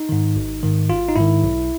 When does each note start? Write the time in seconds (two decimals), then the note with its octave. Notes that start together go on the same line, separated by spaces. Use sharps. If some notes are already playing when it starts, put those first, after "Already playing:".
Already playing: D#4
0.09 G#2 D#3
0.36 G#1
0.63 G#2 D#3
0.90 G#1 F4
1.08 D#4
1.16 G#2 D#3 E4
1.43 B1